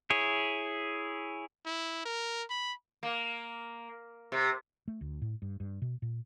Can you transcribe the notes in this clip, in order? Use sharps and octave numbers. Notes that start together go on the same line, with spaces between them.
E4 G#4 C#5
E4
A#4
B5
A#3
C3
A3
D2
A2
G2
G2
B2
A#2